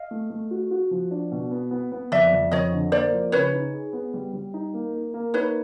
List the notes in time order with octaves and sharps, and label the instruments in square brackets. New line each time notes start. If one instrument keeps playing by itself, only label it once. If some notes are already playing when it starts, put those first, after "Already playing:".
Already playing: [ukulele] D#5 F5
[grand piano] A3
A3
F#4
F#4
F3
D4
B2
B3
B3
B3
[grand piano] F2 [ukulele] D5 E5
[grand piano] F2
[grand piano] F2 [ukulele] C#5 D#5
[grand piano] D3
[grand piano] A#3 [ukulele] C5 D5
[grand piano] F3
[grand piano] C#3 [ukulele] B4 C#5
[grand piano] D#4
G#4
B3
G3
G3
D#4
A#3
A#3
A#3
[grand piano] D#4 [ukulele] B4 C#5